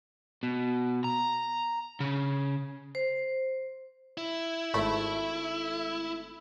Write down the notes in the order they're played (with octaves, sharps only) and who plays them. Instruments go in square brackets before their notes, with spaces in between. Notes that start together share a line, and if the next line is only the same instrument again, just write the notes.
[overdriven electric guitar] B2
A#5
C#3
[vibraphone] C5
[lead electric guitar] E4
[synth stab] G#1 A3 B5